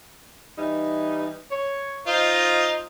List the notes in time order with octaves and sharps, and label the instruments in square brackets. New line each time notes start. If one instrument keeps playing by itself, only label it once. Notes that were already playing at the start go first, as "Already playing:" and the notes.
[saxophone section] E3 G3 D#4
C#5
[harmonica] D#4 F4 C5 [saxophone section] D#5